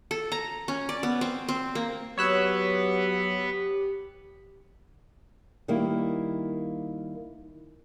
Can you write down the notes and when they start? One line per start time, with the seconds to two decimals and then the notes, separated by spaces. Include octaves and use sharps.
0.11 A4
0.32 A#5
0.68 C#4
0.89 D5
1.03 B3
1.21 C4
1.49 C4
1.75 A#3
2.18 F#3 B3 G4 B4 C#5 E6 F#6
5.68 D#3 G3 A#3 E4